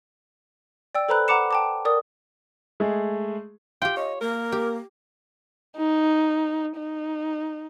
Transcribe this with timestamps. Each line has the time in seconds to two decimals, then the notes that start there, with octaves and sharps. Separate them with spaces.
0.95 D5 G5 E6
1.09 A4 B4 C5 A#5 B5 F#6
1.28 F#5 A#5 B5 D6 C#7 E7
1.51 G5 A5 D6
1.85 A#4 D5 D#6
2.80 G#3 A3 G#4
3.82 F4 G4 G5
3.97 C#5 D#5
4.21 A#3 A#4
4.52 G4
5.76 D#4
6.77 D#4